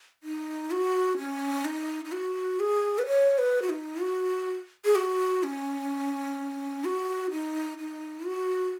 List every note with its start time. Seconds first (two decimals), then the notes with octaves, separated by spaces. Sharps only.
0.23 D#4
0.71 F#4
1.18 C#4
1.65 D#4
2.05 D#4
2.12 F#4
2.60 G#4
2.98 B4
3.07 C#5
3.38 B4
3.62 F#4
3.69 D#4
4.01 F#4
4.85 G#4
4.95 F#4
5.43 C#4
6.85 F#4
7.31 D#4
7.78 D#4
8.26 F#4